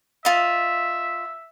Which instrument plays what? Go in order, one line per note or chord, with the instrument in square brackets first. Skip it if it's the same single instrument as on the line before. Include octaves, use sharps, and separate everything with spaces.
[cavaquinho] F4 D#5 [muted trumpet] E5